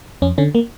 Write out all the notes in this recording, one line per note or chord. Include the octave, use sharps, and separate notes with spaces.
F2 C#4
D3 C#4
A#3